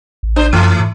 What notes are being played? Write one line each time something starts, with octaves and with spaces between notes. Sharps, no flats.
A1
D4 C5
F#2 E3 A3
G#2